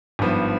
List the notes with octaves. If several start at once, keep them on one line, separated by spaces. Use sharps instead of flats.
G#1 G2 F3 B3